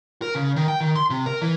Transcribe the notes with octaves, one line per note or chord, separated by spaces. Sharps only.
A#4
C#3
D#3
G5
D#3
C6
C3
A#4
E3